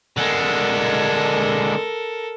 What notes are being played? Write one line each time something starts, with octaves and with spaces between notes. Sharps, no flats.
D3 G#3 A4 A#4